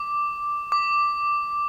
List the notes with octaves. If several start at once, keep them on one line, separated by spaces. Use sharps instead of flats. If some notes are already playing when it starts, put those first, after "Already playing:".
Already playing: D6
D6